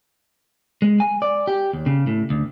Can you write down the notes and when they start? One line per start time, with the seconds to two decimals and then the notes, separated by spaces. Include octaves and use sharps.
0.82 G#3
1.00 G#5
1.22 D5
1.47 G4
1.73 D#2
1.86 C#3
2.07 A2
2.30 D2